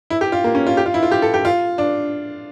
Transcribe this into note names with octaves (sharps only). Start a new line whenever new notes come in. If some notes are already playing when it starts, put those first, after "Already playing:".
E4
G4
F4
A#3
C#4
F4
G4
F4
E4
F4
G4
A4
G4
F4
D4